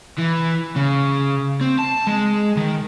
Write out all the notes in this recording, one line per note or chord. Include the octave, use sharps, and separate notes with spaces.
E3
C#3
C4
A5
G#3
D#3